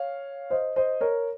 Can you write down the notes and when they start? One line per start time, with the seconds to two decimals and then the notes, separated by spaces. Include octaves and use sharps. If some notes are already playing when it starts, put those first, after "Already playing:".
Already playing: C#5 F5
0.50 C5 D#5
0.76 C5 D#5
1.01 A#4 C#5